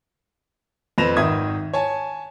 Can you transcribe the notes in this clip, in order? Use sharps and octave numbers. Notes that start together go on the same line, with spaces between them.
F2 C4 B4 A#6 E7 F7
G#1 D#3 E5 D#6 G#6
C#5 G#5 A5